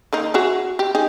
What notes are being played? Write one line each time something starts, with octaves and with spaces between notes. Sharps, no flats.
D#3 A#3 D#4
F#4 G#4 E5
G4
D#4 G4 G#4